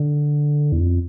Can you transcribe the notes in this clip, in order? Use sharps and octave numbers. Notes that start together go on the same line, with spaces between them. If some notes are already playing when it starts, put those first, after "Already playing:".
Already playing: D3
E2
F2